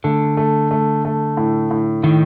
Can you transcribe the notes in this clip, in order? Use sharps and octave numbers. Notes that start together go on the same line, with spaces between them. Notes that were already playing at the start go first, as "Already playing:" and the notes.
D3 A3
A3
A3
A3
A2
A2
A2 D#3